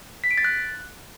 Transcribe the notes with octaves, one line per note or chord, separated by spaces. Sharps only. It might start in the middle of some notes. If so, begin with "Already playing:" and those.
B6
D7
A6
F#6